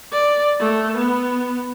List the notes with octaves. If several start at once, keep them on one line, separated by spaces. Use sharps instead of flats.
D5
A3
B3